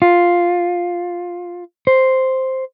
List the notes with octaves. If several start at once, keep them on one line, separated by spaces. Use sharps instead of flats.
F4
C5